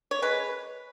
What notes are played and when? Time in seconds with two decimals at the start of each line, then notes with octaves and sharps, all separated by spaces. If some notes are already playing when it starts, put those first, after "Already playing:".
0.11 C#5
0.22 G#3 B4